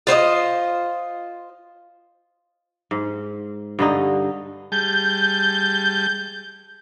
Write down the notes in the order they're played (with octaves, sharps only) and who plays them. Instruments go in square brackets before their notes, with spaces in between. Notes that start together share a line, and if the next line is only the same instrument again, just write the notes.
[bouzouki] F4 C5 C#5 D#5
[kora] G#2
G2 D3 D#4
[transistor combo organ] G3 G#4 A5 [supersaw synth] G6